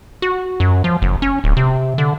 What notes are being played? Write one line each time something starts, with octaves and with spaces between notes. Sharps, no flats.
F#4
F#2
F3
F#1
C#4
D1
C3
D3